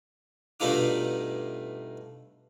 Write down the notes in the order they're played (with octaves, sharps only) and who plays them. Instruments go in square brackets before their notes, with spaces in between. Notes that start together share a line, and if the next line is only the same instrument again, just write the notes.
[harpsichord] G2 B2 A3 D#4 F4 D6